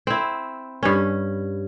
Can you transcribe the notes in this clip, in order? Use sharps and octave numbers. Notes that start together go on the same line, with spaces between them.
C4 E4
G2 C#4